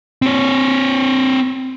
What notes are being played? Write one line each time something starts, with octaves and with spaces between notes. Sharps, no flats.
C4 C#5